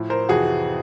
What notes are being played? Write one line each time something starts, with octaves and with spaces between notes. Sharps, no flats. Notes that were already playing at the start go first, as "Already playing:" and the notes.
Already playing: A2 F3
A#4 C5
F2 C3 E3 F#4 G#4